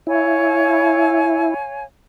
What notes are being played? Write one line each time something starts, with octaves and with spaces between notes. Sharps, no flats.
E4 C#5 F5 G#5